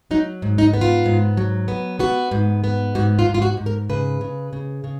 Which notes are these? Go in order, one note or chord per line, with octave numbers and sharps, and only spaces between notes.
F#3 D#4
G#2
D#4
B3
F4
G#2
F#3
B3
B3 F#4
G#2
B3
G#2 F#4
F4
G#2
F4
F#4
G#2
A#4
C#3 B4
C#3
C#3
C#3